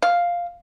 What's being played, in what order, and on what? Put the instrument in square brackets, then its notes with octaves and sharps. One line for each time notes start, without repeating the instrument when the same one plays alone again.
[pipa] F5